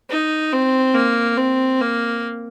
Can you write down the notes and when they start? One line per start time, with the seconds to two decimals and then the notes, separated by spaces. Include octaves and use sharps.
0.10 D#4
0.53 C4
0.95 A#3
1.37 C4
1.81 A#3